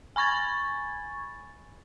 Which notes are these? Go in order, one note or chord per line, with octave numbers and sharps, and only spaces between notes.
G#5 B5 C#6 G#6 A6